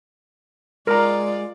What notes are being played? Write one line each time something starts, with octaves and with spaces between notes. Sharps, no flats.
G#3 F4 A#4 D5 A#5